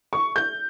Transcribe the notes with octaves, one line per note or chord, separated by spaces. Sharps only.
C#6
G6